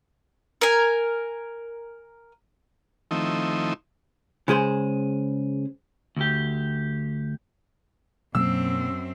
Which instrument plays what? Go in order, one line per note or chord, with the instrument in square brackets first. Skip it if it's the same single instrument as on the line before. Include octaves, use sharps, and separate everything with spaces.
[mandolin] A#4 G#5
[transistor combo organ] D#3 F3 A3 C4 D#4 E4
[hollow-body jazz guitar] C#3 G#3 G#4 C5
[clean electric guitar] D2 G4
[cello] F#2 C4 [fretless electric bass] B2 F#3 A#3 [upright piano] E6